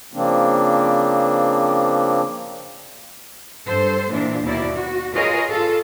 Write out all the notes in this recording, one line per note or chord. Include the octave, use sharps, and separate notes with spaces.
C#3 F3 A#3 C4 D4
G2 A4 C5
A#2 E3 D4
D#2 B2 E4 D5
F#4
F4 G#4 A#4 B4 C#5 D#5
F4 A4